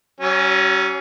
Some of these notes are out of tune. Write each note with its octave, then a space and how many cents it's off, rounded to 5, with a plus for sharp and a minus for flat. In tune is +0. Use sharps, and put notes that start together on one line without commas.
F#3 +45 C#4 +0